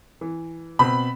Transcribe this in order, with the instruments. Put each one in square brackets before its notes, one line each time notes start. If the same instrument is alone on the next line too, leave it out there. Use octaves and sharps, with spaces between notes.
[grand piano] E3
[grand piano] B2 C4 [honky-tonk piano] B5